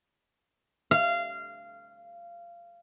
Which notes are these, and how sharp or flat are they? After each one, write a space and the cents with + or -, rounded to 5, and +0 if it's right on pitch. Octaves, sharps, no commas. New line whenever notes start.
F5 -20